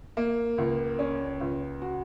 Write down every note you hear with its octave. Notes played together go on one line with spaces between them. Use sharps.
A#3
C#2
C#4
C#2
F#4